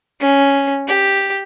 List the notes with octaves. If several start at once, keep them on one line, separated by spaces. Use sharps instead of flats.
C#4
G4